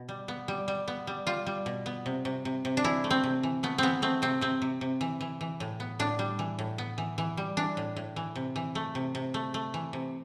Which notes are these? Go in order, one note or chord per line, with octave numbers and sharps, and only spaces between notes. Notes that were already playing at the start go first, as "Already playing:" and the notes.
Already playing: B2
G3
B3
G3
G3
B3
G3
G3 F4
G3
B2
B3
C3
C3
C3
C3
D4
E3 E4
A3
C4
C3
E3
A3 B3
E3 B3 C4
A3 C4
C3 C4
C3 C4
C3
C3
E3
E3
E3
A2
B3
A2 D4
G3
E3
A2
B3
E3
E3
G3
E3 D4
A2
A2
E3
C3
E3
A3
C3
C3
A3
A3
E3
C3